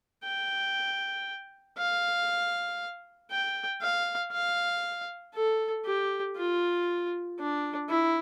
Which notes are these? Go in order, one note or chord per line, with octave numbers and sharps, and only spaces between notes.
G5
F5
G5
F5
F5
A4
G4
F4
D4
E4